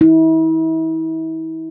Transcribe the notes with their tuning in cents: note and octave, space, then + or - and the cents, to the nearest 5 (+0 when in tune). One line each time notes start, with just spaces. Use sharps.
E4 -40